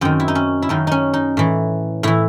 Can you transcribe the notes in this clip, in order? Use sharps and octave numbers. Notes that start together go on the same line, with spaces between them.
F#2 D#3 C4
E4
D#4
C#4
E4
F#2 D#3 D#4
C#4 D#4
D#4
A2 E3
A2 E3 E4